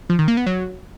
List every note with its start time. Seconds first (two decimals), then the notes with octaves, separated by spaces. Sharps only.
0.10 F3
0.19 D#3
0.28 A#3
0.37 B3
0.46 F#3